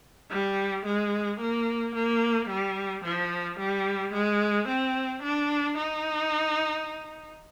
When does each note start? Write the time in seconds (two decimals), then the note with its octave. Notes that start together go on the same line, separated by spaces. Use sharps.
0.30 G3
0.85 G#3
1.40 A#3
1.95 A#3
2.49 G3
3.04 F3
3.59 G3
4.13 G#3
4.68 C4
5.23 D4
5.78 D#4